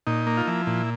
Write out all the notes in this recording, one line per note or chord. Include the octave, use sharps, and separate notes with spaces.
A#2 D#4
A#3
F4
F3 E4
A#2